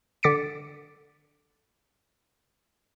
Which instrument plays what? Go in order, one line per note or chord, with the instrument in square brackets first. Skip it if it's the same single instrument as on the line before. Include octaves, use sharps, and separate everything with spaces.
[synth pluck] D3 D6 A6 B6 C#7 D7